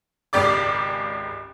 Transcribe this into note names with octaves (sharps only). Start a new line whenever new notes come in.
G#1 C#2 C#3 G4 D5 D6